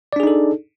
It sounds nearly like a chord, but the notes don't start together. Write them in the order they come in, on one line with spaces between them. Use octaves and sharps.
D5 D4 G#4 D#4 A4